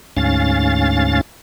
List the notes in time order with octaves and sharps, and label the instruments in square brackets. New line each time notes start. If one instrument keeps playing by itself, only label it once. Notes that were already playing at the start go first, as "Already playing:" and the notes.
[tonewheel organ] D2 G#2 C#4 F5 A6